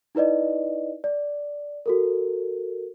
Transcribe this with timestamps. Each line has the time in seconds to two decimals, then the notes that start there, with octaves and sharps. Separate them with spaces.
0.15 D#4 E4 B4 D5 D#5
1.04 D5
1.86 F#4 A4 A#4